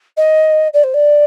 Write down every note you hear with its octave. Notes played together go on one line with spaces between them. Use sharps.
D#5
D5
C5
D5